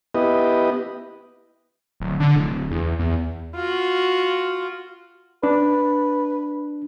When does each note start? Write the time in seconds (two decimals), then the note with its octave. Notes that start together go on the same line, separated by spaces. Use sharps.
0.15 B3 E4 G4 B4 D#5
2.00 D1
2.20 D3
2.36 D1
2.71 E2
2.99 E2
3.55 F4 F#4
5.43 D4 B4